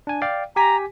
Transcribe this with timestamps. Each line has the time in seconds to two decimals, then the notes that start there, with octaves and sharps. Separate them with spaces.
0.07 D4 G#5
0.22 D5 F5 G5
0.56 G4 G#5 A#5 B6